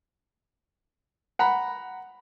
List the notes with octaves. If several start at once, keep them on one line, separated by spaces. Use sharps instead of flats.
F#5 A#5 B5